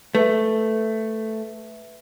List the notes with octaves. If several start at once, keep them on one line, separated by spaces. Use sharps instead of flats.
A3 B4 E5